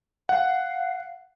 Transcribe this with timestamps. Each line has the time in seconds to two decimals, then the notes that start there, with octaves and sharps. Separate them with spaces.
0.29 F5 F#5